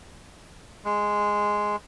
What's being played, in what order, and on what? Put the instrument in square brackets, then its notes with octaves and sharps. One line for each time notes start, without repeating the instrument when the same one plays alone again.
[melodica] G#3